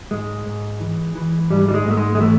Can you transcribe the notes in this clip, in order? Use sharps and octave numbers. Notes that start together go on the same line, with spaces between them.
G#2 G#3
G#2
E3
E3
G#2 G3
G3
G#3
G#2 A3
G#3
G#3
E3 A3